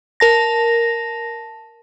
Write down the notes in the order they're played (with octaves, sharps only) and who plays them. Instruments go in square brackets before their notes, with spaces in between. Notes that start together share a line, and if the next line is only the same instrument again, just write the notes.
[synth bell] A#4 A5 A#6